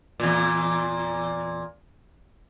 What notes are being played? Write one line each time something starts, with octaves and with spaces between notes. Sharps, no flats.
E2 A#2